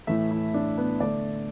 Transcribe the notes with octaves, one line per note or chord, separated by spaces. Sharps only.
A2 E3 A3 E5
E4
D4
B3
D3 A3 D5